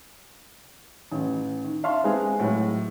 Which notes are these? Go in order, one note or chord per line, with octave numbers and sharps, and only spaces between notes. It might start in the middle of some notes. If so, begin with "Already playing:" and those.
A1
D#3
E5 F5 A5 C6
G#3 C4 G#4 B4
A2 F#3